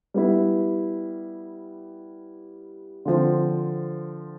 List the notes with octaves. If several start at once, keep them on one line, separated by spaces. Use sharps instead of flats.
G3 B3 E4
D3 F3 C4